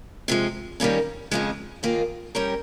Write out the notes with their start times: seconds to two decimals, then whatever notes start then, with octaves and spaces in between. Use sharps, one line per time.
0.28 C3 F3 G#3
0.80 D#3 G3 A#3 C#4
1.31 F2 C#3 F3 G#3
1.83 D#2 D#3 A#3 F4 G#4
2.35 G3 C#4 G4 A#4 C#5